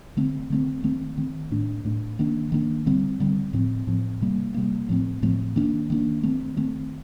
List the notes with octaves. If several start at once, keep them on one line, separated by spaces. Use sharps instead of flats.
D3 A3 C4
D3 A3 C4
D#3 A3 C4
D#3 A3 C4
A2 A3 D4
A2 A3 D4
D#3 A#3 D4
D#3 A#3 D4
D3 G3 C4
D3 G3 C4
A2 F3 C4
A2 F3 C4
C3 G3 A#3
C3 G3 A#3
A2 F3 A3 C4
A2 F3 A3 C4
D#3 A#3 D4
D#3 A#3 D4
D#3 A3 C4
D#3 A3 C4